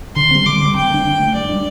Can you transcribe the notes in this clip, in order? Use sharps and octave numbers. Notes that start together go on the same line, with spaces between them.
D3 C6
G3 C4
D3 D6
G3 C4
D3 G5
A3
D4
D3
A3 D4
G2 D5
G3 D4